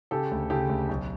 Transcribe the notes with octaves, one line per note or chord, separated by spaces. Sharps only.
C#3 G4 A4
D2
C#3 G4 A4
D2
B1